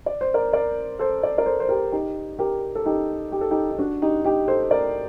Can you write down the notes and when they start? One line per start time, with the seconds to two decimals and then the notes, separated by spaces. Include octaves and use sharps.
0.06 D5
0.21 C5
0.34 A#4 D5
0.53 A#4 D5
0.99 A4 C5
1.23 D5
1.38 A#4 D5
1.46 A4 C5
1.60 C5
1.69 G4 A#4
1.92 D#4 G4
2.39 G4 A#4
2.75 A4
2.86 D#4 G4
3.32 G4
3.41 A4
3.51 D#4 G4
3.71 D#4
3.79 D4 F#4
4.02 D#4 G4
4.25 D#4 G4
4.48 A4 C5
4.71 A#4 D5